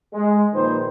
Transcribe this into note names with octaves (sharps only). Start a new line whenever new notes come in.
G#3
A#1 A#2 D#3 D#4 B4 C5